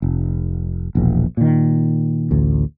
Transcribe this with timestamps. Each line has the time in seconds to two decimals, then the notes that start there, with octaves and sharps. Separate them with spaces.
0.02 F1
0.95 E1 A#1
1.37 A#2 D#3
2.31 A1 D2